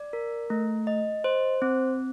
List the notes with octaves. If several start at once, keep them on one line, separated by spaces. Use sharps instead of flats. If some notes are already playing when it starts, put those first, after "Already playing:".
Already playing: D5
A#4
A3
D#5
C5
C4